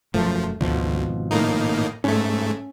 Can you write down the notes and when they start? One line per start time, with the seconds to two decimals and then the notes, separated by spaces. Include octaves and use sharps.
0.14 E1 F#2 F3 A3
0.61 G#1 D2 B2 F3
1.31 A2 A#3 D#4
2.04 G#2 A3 C#4